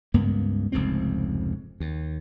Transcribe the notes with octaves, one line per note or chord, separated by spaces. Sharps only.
C#2 G2 A#3 B3
F1 C#2 G#2 C4
D#2